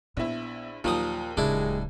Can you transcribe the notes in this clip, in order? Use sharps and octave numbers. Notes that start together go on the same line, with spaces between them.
A#1 B3 E4
D#2 A#2 F3 F#3 D#6
D1 C#3 G#3 D4 E4